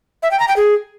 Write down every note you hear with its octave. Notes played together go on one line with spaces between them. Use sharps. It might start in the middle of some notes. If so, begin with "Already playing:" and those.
E5
G5
A#5
G5
G#4